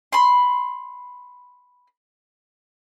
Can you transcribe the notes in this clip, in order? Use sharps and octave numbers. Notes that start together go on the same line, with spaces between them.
B5 C6